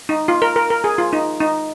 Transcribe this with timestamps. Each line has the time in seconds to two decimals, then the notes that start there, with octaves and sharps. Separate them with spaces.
0.09 D#4
0.28 F4
0.42 A#4
0.56 A#4
0.70 A#4
0.84 G#4
0.98 F4
1.13 D#4
1.40 D#4